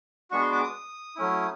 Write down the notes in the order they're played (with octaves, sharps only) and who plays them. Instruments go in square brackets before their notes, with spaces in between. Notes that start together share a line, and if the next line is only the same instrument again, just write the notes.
[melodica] G#3 B3 D4 F#4 C#6
C6
D6
D#6
F#3 A3 C#4 E4